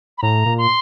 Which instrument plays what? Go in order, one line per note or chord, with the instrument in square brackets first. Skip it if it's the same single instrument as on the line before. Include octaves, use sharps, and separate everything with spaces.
[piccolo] B5
[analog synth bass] A2 [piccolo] A#5
[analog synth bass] A#2
[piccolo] C6